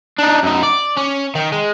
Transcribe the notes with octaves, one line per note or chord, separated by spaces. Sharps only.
D4 D#4
F#2 D#4
D5
C#4
D#3
G#3